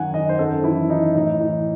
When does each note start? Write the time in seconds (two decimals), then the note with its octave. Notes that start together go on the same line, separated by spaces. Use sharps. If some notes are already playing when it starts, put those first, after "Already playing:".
Already playing: F#2 D#3 F#5 G#5
0.14 D#3 D#5
0.29 C5
0.39 F#2 A4
0.64 E3 E4
0.90 E3 D#4
1.15 A2 D#4
1.40 E3